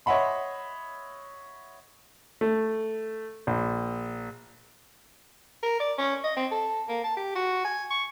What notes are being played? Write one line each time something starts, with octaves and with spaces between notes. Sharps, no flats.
C#5 D#5 E5 F#5 B5 C6
A3
A#1
A#4
D5
C#4
D#5
C4
A4
A#3
A5
G4
F#4
G#5
C#6